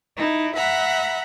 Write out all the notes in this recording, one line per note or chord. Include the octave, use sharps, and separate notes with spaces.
D#4 E4
E5 F#5 A#5 B5